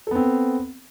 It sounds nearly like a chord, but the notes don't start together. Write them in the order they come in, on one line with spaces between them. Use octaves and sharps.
A4 B3 C4